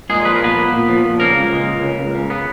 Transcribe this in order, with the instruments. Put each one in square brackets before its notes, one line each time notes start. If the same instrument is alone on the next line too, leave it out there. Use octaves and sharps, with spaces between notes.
[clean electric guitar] A#2 G#3 G#4
F3 B4
A#4
A#2 B3 B4
A#3
A#2
F3
A#2
C#3 A#3 A#4
C#2
G#3
C#2
C#3
C#2
C#3
B3